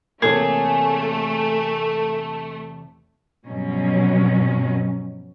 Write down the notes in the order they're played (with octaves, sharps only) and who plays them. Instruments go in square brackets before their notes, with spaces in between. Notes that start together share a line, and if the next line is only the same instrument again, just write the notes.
[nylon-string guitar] E2 C3 C#5 [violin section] A3 [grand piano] A#3 [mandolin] G#4
[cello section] G2 B2 F3 F#3 C#4